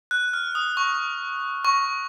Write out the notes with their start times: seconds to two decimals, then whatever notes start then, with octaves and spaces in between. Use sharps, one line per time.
0.11 F#6
0.33 F6
0.55 D#6
0.77 C#6
1.65 C#6